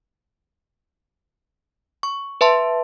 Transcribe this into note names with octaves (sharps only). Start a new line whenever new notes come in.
C#6
B4 E5 A5 C6